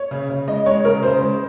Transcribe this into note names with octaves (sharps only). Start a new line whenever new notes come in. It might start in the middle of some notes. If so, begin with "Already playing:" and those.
Already playing: C#5
C#3
C#3
G#3 D#5
G#3 C#5
C#3 A#4
C#3 C5
G#3